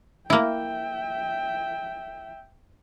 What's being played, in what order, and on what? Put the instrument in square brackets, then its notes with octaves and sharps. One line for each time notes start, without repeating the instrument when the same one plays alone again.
[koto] A#3 E4 [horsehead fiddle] E5 G5